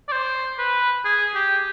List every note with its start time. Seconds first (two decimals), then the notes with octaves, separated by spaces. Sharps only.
0.08 D5
0.12 C5
0.59 B4
1.05 G#4
1.35 G4